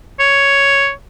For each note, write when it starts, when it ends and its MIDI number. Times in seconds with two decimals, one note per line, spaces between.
0.20 0.91 73